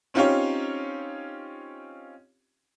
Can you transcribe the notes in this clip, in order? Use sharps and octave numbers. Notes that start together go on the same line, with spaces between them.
C4 C#4 D#4 F4 G4 C#5